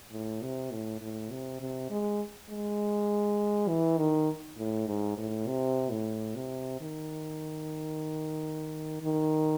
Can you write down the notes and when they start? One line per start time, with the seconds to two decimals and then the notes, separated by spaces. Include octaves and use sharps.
0.12 A2
0.42 C3
0.72 A2
1.01 A2
1.31 C3
1.61 C3
1.91 G#3
2.50 G#3
3.68 E3
3.98 D#3
4.58 A2
4.87 G#2
5.18 A2
5.47 C3
5.91 A2
6.36 C3
6.81 D#3
9.03 D#3